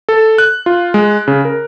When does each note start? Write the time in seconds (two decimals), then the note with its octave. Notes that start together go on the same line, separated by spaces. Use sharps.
0.09 A4
0.38 F#6
0.66 F4
0.94 G#3
1.28 C#3
1.45 A#4